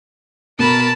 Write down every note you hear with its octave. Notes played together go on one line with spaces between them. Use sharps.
B2 A#4 A5 B5